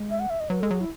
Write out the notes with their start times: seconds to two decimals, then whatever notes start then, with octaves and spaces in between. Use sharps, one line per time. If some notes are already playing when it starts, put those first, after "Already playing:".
Already playing: G#3
0.10 E5
0.20 F#5
0.30 E5
0.40 D#5
0.50 F#3 B4
0.61 G#3 A4
0.70 F#3 G#4
0.80 E4